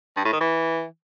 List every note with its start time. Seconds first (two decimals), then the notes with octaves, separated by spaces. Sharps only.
0.17 G2
0.25 A2
0.33 D#3
0.41 E3